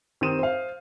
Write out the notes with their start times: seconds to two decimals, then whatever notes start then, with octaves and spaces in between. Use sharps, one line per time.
0.21 D#3 C4 G4 D#6 D#7 E7
0.39 C5 F5